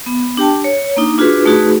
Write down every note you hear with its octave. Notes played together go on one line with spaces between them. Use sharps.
B3
D4 G4 G5 A5
C#5
A#3 D4 D#4
D4 F4 F#4 G#4 B4
A3 D#4 F#4 G#4 B4